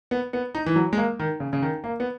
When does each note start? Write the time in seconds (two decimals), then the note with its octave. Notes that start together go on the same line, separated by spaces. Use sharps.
0.11 B3
0.33 B3
0.55 D#4
0.66 E3
0.76 F#3
0.93 G#3
0.97 A#3
1.19 D#3
1.40 C#3
1.53 C#3
1.62 D#3
1.84 A#3
2.00 B3